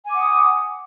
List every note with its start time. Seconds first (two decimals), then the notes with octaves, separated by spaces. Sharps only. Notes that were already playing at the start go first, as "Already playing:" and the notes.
0.04 G#5
0.09 D6
0.14 F#5
0.19 D#6